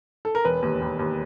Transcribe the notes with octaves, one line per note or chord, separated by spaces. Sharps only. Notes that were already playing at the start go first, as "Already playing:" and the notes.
A4
A#4
E1 B4
D#2
D#2
D#2